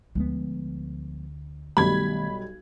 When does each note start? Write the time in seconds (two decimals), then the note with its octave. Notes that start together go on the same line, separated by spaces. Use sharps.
0.15 D2 F3 G#3 B3
1.77 B1 D#3 G3 A3 B5 G#6